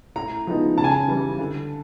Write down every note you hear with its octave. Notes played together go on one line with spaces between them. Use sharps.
A2 A#5
F3 G#3 B3 D#4
C#3 A5
G#5
A5
E3 G3
D3